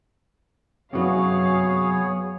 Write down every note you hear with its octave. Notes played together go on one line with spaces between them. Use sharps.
F#2 C3 F#3 B3 G#4 C#5 F5